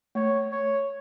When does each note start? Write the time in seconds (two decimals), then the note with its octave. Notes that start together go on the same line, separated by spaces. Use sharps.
0.15 A3 C#5
0.52 C#5